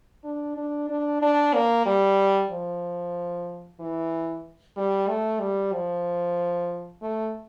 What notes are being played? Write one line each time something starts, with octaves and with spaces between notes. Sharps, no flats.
D4
D4
D4
D4
A#3
G3
F3
E3
G3
A3
G3
F3
A3